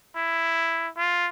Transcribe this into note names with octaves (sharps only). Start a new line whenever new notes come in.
E4
F4